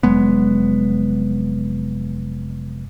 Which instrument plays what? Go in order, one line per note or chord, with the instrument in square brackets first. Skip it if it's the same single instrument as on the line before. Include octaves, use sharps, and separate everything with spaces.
[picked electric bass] F1 F#3 G#3 B3